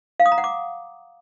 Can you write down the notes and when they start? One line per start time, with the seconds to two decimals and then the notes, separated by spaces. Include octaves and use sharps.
0.20 F5
0.26 D#6
0.32 A#5
0.38 F#5
0.44 D6